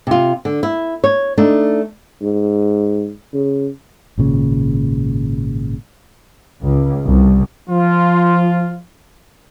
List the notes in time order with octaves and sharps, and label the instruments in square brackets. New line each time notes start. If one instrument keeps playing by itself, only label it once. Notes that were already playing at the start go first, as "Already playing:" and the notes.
[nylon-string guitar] C3 F4
D3
E4
C#5
A3 D4 D#4
[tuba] G#2
C#3
[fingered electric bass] G#1 A#2 C#3
[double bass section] C#2
C2
[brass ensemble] F3 F4